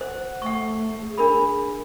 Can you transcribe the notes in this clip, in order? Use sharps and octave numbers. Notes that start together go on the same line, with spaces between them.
C5 F#5
A3 F#5 C#6
G#4
D4 A#4 B5